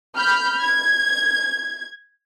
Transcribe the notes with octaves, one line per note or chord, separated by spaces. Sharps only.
B5 F6 G6
G#6